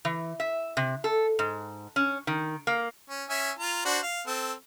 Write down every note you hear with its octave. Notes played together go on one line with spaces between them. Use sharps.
E3
E5
C3
A4
G#2
C#4
D#3
A#3
C#4
C#4 E5 G#5
F4 A#5
D4 F#4 C5
F5
C4 A4